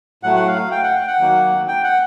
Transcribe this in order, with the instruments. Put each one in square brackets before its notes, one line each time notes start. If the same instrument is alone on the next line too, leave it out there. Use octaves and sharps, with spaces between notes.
[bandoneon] A2 F#3 A3 F#5
F#5
F5
G5
F#5
G5
F#5
D#3 F#3 A#3
G5
F#5